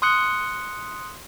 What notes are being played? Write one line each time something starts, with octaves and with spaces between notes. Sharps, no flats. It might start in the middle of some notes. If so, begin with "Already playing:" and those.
C6 D#6 F#6 C#7